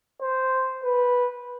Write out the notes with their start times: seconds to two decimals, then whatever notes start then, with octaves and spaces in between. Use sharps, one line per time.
0.21 C5
0.84 B4